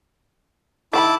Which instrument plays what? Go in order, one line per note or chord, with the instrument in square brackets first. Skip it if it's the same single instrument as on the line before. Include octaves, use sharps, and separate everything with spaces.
[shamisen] D#3 F#5 B5 [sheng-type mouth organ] E4 A5 D6